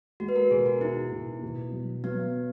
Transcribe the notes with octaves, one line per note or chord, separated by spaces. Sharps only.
G#3 F#4
B4
A#4
B2 G#4
F#4
D#4 E4
B2
B2
F#3
F#3 B3